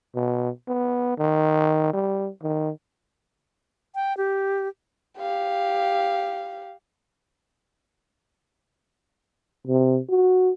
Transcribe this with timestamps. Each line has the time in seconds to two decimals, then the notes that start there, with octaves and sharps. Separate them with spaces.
0.15 B2
0.68 B3
1.18 D#3
1.93 G3
2.43 D#3
3.95 G5
4.17 G4
5.18 G4 F5
9.67 C3
10.10 F#4